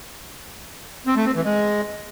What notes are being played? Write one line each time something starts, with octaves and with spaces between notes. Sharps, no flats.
C4
A3
C4
E3
G#3